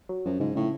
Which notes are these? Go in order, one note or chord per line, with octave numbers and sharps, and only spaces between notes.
F#3
F#2 F3
G#2 C#3
A2 C#3